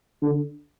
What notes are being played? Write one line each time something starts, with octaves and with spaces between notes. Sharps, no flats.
D3